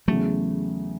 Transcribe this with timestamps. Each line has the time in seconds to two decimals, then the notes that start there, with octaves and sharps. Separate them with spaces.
0.08 E2 C#3 E3 F#3 A3